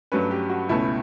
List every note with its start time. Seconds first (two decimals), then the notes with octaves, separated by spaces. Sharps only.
0.12 G2 F#3 A3 C#4 B4
0.31 G4
0.50 F#4
0.69 C#2 B2 A3 C#4 E4